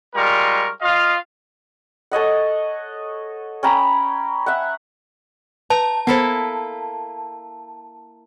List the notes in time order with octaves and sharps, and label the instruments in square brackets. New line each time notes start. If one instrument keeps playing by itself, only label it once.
[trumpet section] G3 G#3 F4 A#4 C#6
F4 D#5 F5
[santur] A4 C#5 D#5 F#5
C#4 G5 A#5 B5
E5 F#5
[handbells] B4 [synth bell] A5 [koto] A#5
[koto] A#3 E4 A4 [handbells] B3 C5